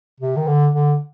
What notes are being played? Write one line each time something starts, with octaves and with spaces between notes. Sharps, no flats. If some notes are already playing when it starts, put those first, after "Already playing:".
C3
D#3
D3
D3